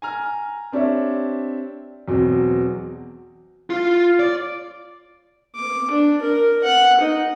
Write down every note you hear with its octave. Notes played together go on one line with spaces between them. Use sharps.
G#5 A#5 F6
C4 D4 G4 C#5 E5
E2 B2 F#3 C4
F4
D5
D6
D4
A#4
F#5
D#4